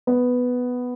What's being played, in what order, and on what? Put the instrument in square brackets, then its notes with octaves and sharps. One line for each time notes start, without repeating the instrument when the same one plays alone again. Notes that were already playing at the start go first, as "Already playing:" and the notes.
[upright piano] B3